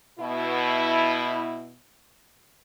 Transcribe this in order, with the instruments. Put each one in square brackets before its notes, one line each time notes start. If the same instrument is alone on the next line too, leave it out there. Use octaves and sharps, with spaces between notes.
[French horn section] B2 E4